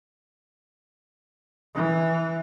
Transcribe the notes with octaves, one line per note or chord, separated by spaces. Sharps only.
E3